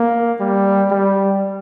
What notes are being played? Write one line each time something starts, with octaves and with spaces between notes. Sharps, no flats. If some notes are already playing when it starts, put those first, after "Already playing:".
Already playing: A#3
G3
G3